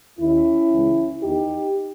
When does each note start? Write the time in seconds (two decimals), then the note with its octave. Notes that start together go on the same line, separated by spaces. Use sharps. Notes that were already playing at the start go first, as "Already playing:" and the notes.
0.19 D#2 D#3 C#4 E4
0.71 C#2 C#3 E3
1.22 E2 D#3 D#4 G4